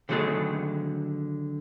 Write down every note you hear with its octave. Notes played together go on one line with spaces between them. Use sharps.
D3 D#3 F#3 A3 G#4 A4